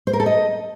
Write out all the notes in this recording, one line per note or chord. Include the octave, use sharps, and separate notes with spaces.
C5
A#4
A4
D#5